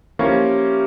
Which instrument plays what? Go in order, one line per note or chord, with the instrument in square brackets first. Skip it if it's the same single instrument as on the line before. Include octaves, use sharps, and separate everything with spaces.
[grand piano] F3 A#3 C#4 E4 [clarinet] G4